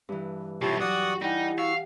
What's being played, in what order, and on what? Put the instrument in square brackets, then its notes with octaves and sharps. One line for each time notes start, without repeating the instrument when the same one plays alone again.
[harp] G2 E3
[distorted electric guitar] B1 C3 [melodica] E4 C#5 A5 [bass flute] F4 [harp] G4
[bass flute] F#3 [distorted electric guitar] F#4 [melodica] D5 F#5 D#6
[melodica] G3 [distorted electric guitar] D#4 [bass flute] E4 [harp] G4 F#5 G#5
[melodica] F#4 C#6 E6 [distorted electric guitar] F5